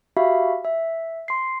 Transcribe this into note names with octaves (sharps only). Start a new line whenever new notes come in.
F#4 G4 E5 F5 B5
E5
C6 C7